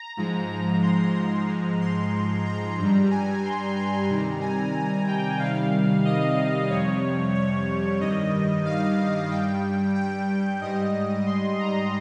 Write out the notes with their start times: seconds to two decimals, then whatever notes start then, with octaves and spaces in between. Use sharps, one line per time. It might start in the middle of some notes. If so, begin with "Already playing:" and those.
Already playing: A#5
0.17 G#2 F3 G#3
0.82 C6
1.15 A#5
1.47 G#2 F3 G#3
1.81 C6
2.46 A#5
2.78 G2 G3
3.10 G#5
3.43 C6
3.76 A#5
4.09 C3 D#3 G3
4.41 G#5
5.07 G5
5.39 C3 D#3 G3 F5
6.05 D#5
6.69 F2 C3 G3 C#5
7.34 C#5
8.00 G2 D#3 G3 D#5
8.65 F5
9.30 G2 G3 G5
9.95 G5
10.61 G#2 G3 D#5
11.26 C6
11.60 A#5